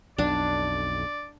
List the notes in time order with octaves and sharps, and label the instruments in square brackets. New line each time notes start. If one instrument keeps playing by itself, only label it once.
[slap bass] B1 F2 [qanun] D4 [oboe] D5